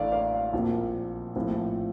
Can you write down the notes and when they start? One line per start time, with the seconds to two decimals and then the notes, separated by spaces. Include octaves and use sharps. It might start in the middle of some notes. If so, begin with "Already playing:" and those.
Already playing: A1 A2 A3 D4 D5 F5
0.12 D5 F5
0.53 A#1 A#2 F3 C4
1.36 A#1 A2 F3 C4